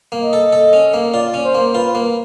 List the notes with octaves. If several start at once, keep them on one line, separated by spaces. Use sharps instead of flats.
A#3
D#5
A4
A4
C#4
A#3
F4 D5
C#4
C5
A#3
F4 B4
A#3